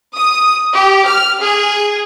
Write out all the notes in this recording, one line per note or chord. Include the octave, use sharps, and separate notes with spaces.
D#6
G4
F6
G#4